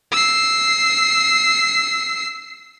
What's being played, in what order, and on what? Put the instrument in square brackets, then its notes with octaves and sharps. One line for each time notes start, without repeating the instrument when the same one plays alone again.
[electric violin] E6 C7